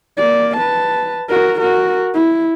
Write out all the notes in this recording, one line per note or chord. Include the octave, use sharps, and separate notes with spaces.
A#3 D5
B4 A5
F#4 A#4
F#4 A#4
E4